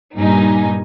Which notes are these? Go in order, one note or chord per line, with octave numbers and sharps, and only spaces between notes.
G2 A#2 D#4 G#5